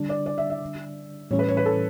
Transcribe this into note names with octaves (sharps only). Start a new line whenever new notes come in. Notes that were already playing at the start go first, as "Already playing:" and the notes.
Already playing: D3 G3 D4
D5
D5
E5
E5
A2 E3 G3 C#4 C#5
B4
C#5
B4
A4